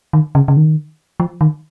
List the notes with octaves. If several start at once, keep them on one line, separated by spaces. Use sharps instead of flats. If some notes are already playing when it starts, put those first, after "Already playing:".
D#3
C#3
C#3
D#3
F3
D#3